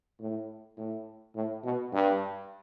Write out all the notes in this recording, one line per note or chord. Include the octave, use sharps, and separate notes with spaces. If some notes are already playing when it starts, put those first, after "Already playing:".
A2
A2
A2
B2
G2